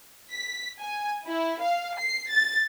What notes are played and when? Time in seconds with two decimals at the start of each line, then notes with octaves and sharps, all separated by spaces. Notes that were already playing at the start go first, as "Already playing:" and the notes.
0.32 B6
0.80 G#5
1.26 E4
1.62 F5
1.98 C7
2.30 A6